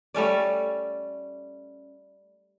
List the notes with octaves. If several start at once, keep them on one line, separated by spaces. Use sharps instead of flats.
G3 A3 C#4 D5